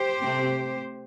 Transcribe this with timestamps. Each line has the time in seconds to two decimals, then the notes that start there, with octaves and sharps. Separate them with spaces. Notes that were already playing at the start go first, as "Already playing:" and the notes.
Already playing: G4 C5
0.21 C3 A3 C4